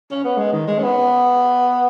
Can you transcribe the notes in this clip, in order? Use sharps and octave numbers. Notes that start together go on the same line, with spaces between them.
C#4
B3
G#3
D#3
G#3
C#4
B3